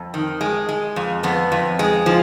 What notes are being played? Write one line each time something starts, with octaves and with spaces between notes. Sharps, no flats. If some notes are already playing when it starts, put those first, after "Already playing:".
Already playing: F2
D#3
G#3
G#3
F2
F2 B3
F2
G#3
F3